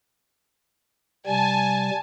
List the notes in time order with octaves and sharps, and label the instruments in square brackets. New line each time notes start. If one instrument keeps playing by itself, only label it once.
[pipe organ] C3 G3 [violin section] G#5 A5